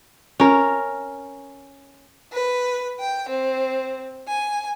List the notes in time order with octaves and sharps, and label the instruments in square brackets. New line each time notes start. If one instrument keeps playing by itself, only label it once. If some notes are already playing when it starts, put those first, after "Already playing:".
[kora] C#4 A#4
[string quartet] B4
G5
C4
G#5